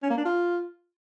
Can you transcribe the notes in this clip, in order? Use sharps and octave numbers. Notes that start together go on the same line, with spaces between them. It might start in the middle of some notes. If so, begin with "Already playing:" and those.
C#4
A#3
D4
F4